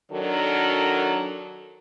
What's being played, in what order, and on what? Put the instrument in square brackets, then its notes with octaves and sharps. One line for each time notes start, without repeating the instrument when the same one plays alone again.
[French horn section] D#3 F#3 D4 F#4 A4 A#4